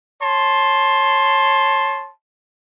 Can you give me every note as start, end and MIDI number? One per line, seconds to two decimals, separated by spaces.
0.21 2.09 73
0.21 2.09 81
0.21 2.09 84